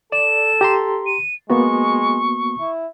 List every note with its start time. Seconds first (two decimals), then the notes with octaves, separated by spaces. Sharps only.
0.12 A4 D5 E7
0.61 G4 A#5 C6
1.06 D#7
1.50 G#3 A#3 B3 F#4 C#6
2.60 E4